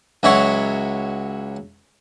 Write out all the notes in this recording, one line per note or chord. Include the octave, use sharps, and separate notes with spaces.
C#2 F#3 E4 C#5